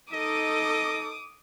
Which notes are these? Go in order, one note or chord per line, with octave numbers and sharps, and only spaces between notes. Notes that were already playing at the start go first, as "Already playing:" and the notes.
D#4 A4 D#5 D6 D#6